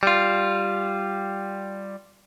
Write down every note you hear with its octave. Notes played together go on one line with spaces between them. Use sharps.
G3 F4